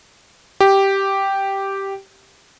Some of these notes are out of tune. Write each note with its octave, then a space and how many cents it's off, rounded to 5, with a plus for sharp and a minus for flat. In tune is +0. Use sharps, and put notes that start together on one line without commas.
G4 -5